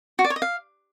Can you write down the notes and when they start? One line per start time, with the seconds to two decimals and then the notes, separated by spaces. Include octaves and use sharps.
0.19 F#4
0.25 D5
0.30 C#5
0.36 D#5
0.42 F5